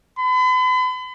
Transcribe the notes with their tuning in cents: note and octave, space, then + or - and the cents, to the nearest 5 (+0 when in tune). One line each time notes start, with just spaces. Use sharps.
B5 +40